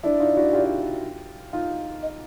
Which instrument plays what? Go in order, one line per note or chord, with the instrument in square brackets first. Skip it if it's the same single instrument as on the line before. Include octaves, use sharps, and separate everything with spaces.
[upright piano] D4 E4 [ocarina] D5
[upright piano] D#4 F4
E4 F#4
F4 G4
D#4 F4
[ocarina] D#5